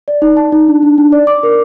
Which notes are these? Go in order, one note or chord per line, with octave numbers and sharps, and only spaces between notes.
D5
D#4
A5
D#4
D4
D4
D4
D5
D6
A#4